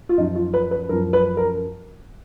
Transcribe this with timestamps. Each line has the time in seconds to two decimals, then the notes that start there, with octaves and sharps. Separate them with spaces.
0.09 F4
0.18 F#2 F3 D#4
0.35 F4
0.54 B4
0.71 B4
0.89 F#2 F3 A#4
1.13 B4
1.37 A#4